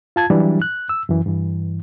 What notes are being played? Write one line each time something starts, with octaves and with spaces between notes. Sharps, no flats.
F4 A5 G#6
E3 F#3 G3 D4 E4
F#6
E6
F#2 E3
G2 E3